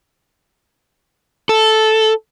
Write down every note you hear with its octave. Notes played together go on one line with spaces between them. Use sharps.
A4